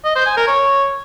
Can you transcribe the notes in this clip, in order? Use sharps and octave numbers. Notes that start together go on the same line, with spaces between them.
D#5
C5
G#5
A#4
C#5